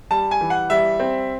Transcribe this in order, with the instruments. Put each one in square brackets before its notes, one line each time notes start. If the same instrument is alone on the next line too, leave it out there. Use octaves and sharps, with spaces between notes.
[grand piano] G3 A5
G#5
E3
F#5
G3 E5
C4